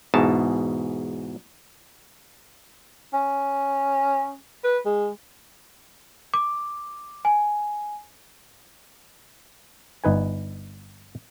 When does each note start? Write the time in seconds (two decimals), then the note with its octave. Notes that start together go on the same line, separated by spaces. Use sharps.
0.14 E2 G#2 B2 A5
3.14 C#4
4.64 B4
4.85 G#3
6.34 D6
7.25 G#5
10.04 G1 D#4 B4 G#5